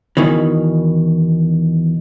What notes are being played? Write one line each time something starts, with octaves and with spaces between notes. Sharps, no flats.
E2 B2 D#3 E3